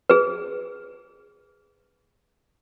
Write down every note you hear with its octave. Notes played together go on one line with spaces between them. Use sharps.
G#4 B4